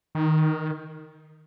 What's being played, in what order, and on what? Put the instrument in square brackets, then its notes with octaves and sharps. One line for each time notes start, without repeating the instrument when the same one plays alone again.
[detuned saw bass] D#3